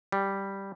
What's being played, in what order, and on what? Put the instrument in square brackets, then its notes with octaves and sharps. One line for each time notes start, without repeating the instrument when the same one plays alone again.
[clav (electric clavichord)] G3